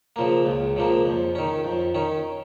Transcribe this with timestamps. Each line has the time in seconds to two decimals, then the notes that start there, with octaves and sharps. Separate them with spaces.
0.16 C#3 F3 A#3
0.46 C#2
0.76 C#3 F3 A#3
1.05 F2
1.35 D#3 C#4
1.65 F2
1.95 D#3 C#4